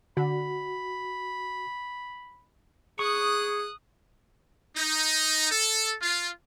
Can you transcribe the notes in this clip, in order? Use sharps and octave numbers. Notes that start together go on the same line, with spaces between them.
D3 F#4 B5
G#4 C#6 D#6 F#6
D#4
A4
F4